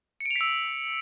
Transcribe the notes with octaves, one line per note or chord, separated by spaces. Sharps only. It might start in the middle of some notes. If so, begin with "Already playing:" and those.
C#7
D7
F7
B6
E6